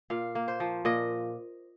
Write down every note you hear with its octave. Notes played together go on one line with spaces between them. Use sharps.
A#2 F5
A#3
C5
F3
A#2 D#5